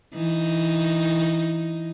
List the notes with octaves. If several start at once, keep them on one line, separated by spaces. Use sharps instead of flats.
E3 D#4